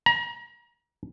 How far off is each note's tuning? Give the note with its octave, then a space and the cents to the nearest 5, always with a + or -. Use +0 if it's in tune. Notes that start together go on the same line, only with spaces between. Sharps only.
A#5 +35